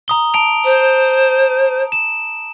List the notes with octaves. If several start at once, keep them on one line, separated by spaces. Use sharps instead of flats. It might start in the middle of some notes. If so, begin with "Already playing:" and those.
A#5 D#6 G7
A5 D7 F7
C5
E7